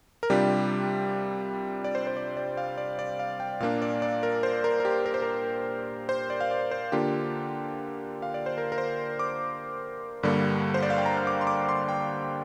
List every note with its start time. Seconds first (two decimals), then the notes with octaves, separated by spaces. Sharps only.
0.23 A#4
0.30 C3 G3 D4 F4 G4
1.84 D5
1.95 C5
2.07 C5
2.17 D5
2.37 D5
2.57 F5
2.78 D5
2.99 D5
3.19 F5
3.40 G5
3.60 A#2 A#3 D4 F5
3.82 D5
4.02 D5
4.23 A#4
4.43 C5
4.64 A#4
4.80 A#4
4.85 G4
5.06 A#4
5.14 C5
5.22 A#4
6.09 C5
6.30 D5
6.40 F5
6.51 D5
6.71 C5
6.92 D3 A#3 D4 F4 G4
8.22 F5
8.34 D5
8.46 C5
8.58 A#4
8.72 A#4
8.78 C5
9.19 D6
10.23 G2 D3 G3 A#3
10.74 C5
10.83 D5
10.90 F5
10.98 G5
11.06 A#5
11.17 F6
11.27 D6
11.41 C6
11.47 D6
11.69 C6
11.89 G5